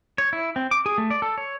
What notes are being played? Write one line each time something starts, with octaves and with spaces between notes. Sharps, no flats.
C#5
E4
C4
D6
G#4
A3
D5
A4
C#5